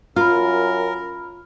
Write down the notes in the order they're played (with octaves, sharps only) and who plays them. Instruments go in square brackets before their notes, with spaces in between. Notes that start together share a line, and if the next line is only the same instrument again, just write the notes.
[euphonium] F#2 [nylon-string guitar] F4 [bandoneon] A#4 [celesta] B5 F6